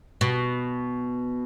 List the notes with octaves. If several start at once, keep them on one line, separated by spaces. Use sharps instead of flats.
B2